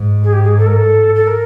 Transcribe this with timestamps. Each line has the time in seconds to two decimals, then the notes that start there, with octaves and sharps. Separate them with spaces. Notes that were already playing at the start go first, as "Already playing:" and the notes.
Already playing: G#2
0.23 G#4
0.33 G4
0.43 G#4
0.58 A4
0.67 A#4
0.76 A4
1.15 A4
1.27 A#4